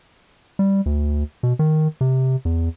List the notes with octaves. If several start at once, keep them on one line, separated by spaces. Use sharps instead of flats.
G3
D2
B2
D#3
C3
E2